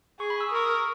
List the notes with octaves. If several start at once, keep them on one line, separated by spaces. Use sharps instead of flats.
G#4 C#6
B5
E6
D#6
A#4 C#6
D#6